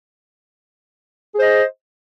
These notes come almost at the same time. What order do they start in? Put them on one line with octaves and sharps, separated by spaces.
G#4 C5 D#5